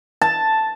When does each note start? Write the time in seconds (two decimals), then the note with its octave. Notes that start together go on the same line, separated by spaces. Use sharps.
0.21 A5